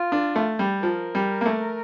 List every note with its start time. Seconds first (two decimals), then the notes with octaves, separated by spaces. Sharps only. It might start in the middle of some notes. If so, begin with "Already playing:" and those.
Already playing: F4
0.12 D4
0.36 A3
0.59 G3
0.83 F3 A#4
1.15 G3
1.41 A#3
1.46 A3